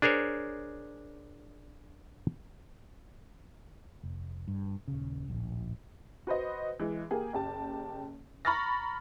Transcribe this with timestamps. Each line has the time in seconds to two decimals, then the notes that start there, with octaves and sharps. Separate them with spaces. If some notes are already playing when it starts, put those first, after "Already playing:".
0.02 D4 G#4 A#4 C5 C#5
4.03 F1
4.48 G2
4.88 D#1 C#3
5.28 D1 A#1
6.27 F#4 B4 C5 D#5
6.79 E3 G#3
7.11 A#3 G4 G#4
7.33 F#1 G4 A5
8.45 A#5 B5 C#6 F6 A6 A#6